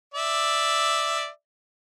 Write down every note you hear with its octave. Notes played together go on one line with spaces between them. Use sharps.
D5 E5